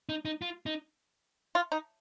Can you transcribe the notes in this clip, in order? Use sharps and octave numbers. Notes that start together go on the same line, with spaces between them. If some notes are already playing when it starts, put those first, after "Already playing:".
D#4
D#4
F4
D#4
F4
D#4